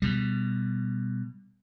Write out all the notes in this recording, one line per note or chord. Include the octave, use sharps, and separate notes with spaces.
B2 G3